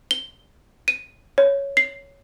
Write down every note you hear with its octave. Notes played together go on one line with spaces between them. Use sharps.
G7
D#7
C#5
C7